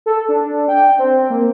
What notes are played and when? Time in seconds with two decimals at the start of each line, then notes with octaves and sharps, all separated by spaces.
0.06 A4
0.29 D4
0.68 G5
0.99 C4
1.30 A#3